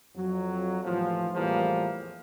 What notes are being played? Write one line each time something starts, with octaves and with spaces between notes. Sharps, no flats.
F2 F#3
D#2 A2 E3 F3
E2 A2 E3 F3 G3 A#3